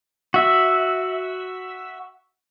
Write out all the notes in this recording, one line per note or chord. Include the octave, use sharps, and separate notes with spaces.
F#4 E5